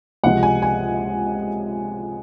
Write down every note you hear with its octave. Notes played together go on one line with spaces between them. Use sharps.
C#2 C3 F3 G#3 F#5
G#5
G#5